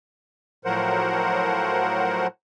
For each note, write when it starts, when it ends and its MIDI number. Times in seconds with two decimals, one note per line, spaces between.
0.65 2.27 45
0.65 2.27 53
0.65 2.27 54
0.65 2.27 70
0.65 2.27 72
0.65 2.27 78